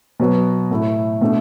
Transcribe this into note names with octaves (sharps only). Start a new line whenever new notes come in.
B2 F#3 B3
A2 A3 E4
B2 A3 D4